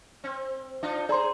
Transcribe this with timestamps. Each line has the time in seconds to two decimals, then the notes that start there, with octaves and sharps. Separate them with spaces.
0.24 C4
0.83 D4 D#4 F4
1.09 G#4 C5 D5 A#5 C6